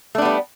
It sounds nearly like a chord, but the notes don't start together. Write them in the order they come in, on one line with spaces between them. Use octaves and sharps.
A3 D4 B3 G3